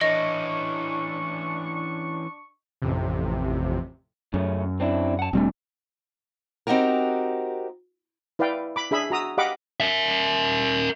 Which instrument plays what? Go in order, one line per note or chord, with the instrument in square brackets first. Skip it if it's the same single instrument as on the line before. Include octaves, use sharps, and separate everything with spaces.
[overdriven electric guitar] E3 C#4 [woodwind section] D4 C#6 [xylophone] D#5
[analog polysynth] A1 F2 C3
[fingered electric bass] F#2 [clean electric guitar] C#3 A3 C#4
[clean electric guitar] C4 D4 E4
F#5 A5
[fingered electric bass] E1 G3 A3 [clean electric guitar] C4 D4
[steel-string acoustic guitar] C4 D#4 F#4 G4 A#4
[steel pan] E4 B4 D5 F5 G5
B5 D6
D4 G#4 E5 B5
F#4 A#5 D#6 E6
G4 D#5 F5 F#5 B5 D6
[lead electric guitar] A#4 E5